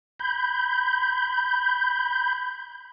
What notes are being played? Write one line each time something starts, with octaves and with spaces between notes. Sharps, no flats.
B5 G6